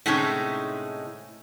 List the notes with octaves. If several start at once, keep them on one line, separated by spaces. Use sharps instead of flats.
A2 C3 G#3 C#4 D#4